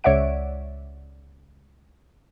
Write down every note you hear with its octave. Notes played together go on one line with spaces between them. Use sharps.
C#2 C#5 D5 E5 F#5 D7